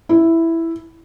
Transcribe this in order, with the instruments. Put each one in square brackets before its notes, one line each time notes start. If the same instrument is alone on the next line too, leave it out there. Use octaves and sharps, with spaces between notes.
[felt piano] E4